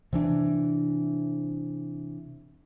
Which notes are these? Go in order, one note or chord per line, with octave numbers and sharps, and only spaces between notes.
C3 E3 D4